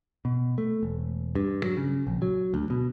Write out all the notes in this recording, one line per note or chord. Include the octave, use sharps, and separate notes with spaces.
B2
A3
E1
G2
F#3
C#3
A#1
F#3
D2
B2